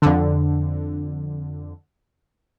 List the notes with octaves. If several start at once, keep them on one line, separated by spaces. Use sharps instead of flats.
F2 D3